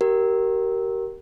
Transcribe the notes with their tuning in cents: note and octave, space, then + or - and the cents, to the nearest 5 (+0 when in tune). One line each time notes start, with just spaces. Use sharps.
G4 -35 A#4 +0